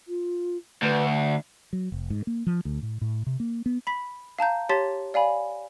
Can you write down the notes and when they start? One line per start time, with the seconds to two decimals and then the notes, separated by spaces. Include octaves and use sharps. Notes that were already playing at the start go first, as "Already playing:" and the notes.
0.08 F4
0.83 D2 B4
1.16 D4
1.73 F#3
1.92 F1
2.10 G#2
2.27 A#3
2.47 F3
2.65 D2
2.82 A2
3.01 A2
3.26 C3
3.40 A#3
3.66 B3
3.87 B5 B6
4.39 F5 A5 A#5 G6
4.69 G4 C#5 A5 C6 A6 B6
5.14 D5 F5 G#5 B5